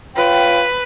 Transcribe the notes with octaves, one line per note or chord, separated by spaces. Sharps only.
F4 B4 C#5 G5